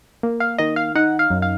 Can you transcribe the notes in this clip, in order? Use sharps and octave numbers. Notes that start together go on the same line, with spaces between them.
A#3
F5
D#3 D#5
F5
D#4 F#5
F5
F#2
F5